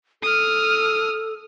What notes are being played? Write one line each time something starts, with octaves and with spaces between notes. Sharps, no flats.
A4 D#6 F6